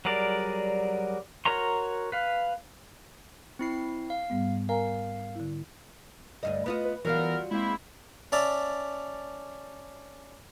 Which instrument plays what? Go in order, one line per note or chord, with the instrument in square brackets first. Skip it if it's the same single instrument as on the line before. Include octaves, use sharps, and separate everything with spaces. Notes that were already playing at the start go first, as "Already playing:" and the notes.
[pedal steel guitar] F#3 G3 G#4 A#4 D5
F#4 A#4 C#5 A#5 C6
B4 F5
[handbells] C4 E4 C7
F5
[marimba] G#2 G3 B3
[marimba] A#4 G#5 A#5 [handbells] F5
[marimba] D3 E4
[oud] D2 G2 D#5
B3 F4 D#5
[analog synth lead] B4
[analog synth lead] E3 [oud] F#3 G3 F4 [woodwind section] B3 A#4
[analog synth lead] G#3 [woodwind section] A#3 C4 E4
[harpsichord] C#4 D5 E5 A5 A#5